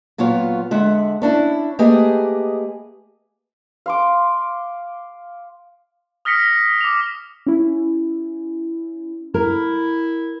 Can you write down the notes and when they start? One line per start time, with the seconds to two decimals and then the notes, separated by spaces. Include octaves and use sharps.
0.18 A#2 F#3 B3 F4 C#5
0.71 D3 G#3 E5 F#5
1.22 C#4 D4 E4
1.79 A3 A#3 G4 G#4 B4 D#5
3.86 F5 C6 D6
6.25 D#6 F6 A#6 B6 C#7
6.81 D6 F7
7.46 C#4 E4
9.34 E4 A#4